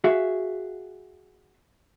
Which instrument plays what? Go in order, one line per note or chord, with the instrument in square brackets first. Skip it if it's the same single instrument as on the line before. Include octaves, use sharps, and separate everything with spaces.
[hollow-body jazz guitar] F#4 G#4 E5 F5